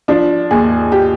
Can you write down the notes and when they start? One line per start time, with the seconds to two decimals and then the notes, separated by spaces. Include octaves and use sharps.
0.08 F3 D4
0.51 D#2 G#4
0.92 G4